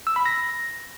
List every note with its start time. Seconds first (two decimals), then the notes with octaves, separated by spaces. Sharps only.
0.07 E6
0.16 B5
0.26 A#6